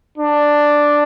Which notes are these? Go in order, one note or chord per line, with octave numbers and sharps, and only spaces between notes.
D4